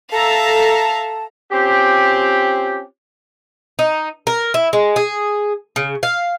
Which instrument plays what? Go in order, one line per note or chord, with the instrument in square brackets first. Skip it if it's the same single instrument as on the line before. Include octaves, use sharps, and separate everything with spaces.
[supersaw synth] A4 A#5 [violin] E5 F5 [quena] A5
[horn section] C4 C#4 F4 G4
[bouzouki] D#4
A#4
E4
G#3
G#4
C#3
F5